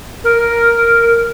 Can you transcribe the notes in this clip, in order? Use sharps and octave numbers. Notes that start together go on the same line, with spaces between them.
A#4